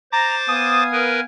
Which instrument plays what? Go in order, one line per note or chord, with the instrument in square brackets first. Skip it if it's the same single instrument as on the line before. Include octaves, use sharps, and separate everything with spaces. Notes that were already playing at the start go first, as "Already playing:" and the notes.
[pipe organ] C5 D6 A6 [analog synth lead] A#5
[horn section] B3 F5 G#5 [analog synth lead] D#6
[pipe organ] A#4 B4